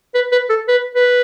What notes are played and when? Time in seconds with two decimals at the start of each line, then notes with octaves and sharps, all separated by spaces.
0.15 B4
0.32 B4
0.49 A4
0.68 B4
0.95 B4